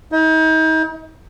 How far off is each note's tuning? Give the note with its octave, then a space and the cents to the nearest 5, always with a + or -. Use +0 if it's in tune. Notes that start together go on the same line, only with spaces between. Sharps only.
D#4 +40